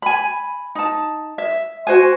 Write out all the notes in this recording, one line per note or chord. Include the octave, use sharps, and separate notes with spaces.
G#5 B5
D#4 A5
E5
F#4 C5 G#5